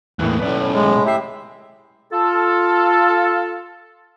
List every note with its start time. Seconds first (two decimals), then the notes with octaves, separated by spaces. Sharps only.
0.19 E2 A2 E3 A#3 F#6
0.40 B1 A2 C#4 B4 D5
0.73 G#3
1.06 G4 E5 G5 C7
2.13 F4 A4